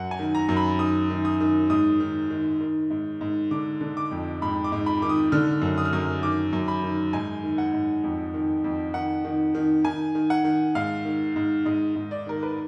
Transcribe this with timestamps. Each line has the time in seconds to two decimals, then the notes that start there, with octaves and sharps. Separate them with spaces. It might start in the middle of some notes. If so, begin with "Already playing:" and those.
Already playing: F#2 F#5
0.11 G#5
0.19 D#3
0.35 A#5
0.49 F#2
0.57 B5
0.79 D#3 D#6
1.10 D#3
1.25 D#6
1.40 D#3
1.70 G#2 D#6
2.00 D#3
2.30 D#3
2.60 D#3
2.90 G#2
3.21 G#2
3.51 D3 D6
3.81 D3
3.97 D6
4.11 F2
4.42 G#2 B5
4.64 D6
4.72 G#2
4.86 B5
5.02 D#3 D6
5.09 D#6
5.32 D3 F6
5.62 F#2
5.78 D#6
5.85 F6
5.93 F#2 D#6
6.22 D#3 D6
6.53 F#2
6.68 B5
6.83 D#3
7.13 G#2 G#5
7.43 D#3
7.58 F#5
7.73 G#2
8.04 F2
8.34 D#3
8.64 F2
8.94 D#3 F#5
9.24 D#3
9.55 D#3
9.85 D#3 G#5
10.15 D#3
10.30 F#5
10.45 D#3
10.75 G#2 F5
11.05 D#3
11.36 G#2
11.65 G#2 D#5
11.95 G#2
12.11 D5
12.26 D#3 A#4
12.43 B4